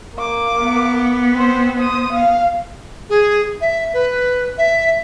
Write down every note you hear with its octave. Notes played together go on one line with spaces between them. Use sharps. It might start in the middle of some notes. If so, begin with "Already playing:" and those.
A#3 D6
B3
C4 C5
C5 D#6
F5
G#4
E5
B4
E5